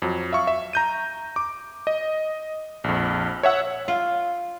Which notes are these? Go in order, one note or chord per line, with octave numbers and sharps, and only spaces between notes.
F2 F#3
E5 F5 C#6
E5
A#5 G6 D#7
D6
D#5
A#1 F2
C#5 E5 F#5 E6
F4